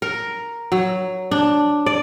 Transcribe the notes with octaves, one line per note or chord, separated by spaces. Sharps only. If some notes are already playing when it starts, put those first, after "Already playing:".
A#4
F#3
D4
D5